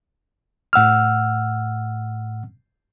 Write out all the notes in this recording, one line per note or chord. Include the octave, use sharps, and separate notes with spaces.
A2 F#5 E6 F6